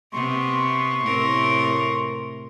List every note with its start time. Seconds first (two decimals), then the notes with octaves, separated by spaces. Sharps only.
0.13 C3 B3 C6 C#6
1.03 A2 C3 A#4